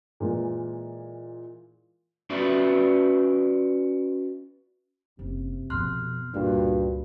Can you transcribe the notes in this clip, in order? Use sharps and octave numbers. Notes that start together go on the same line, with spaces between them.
A#2 E3 G#3
C#4 F4 F#4 B4 D5 E5
F#1 C3
F2 B2 C6 F6 F#6
C#2 G2 A#2 F#4